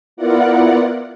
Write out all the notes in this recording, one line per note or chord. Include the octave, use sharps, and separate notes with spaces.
B3 E4 F4 A#4 D5 F#5